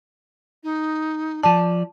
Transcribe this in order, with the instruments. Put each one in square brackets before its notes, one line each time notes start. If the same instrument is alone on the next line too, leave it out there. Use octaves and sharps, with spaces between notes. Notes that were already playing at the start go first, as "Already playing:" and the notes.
[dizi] D#4
[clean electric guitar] F3 D5 [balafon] A5